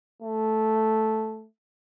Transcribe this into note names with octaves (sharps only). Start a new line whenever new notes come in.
A3